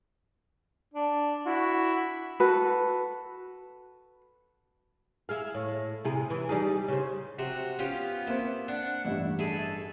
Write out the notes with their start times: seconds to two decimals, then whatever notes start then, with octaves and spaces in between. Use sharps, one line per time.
0.94 D4
1.46 E4 F#4
2.40 F#4 A4 B4
5.29 E4 G#4 F5
5.55 A2
6.05 C3 E4 G#4
6.30 E3 E4
6.49 G3 D#4 G#4
6.88 C#3 C5
7.39 C3 F#4 F#5
7.79 B3 C#4 F4 G4
8.27 A#3 C4 E4 C5
8.68 D4 F#5
9.05 A1 G2 G3 E4
9.39 E4 G#4 A4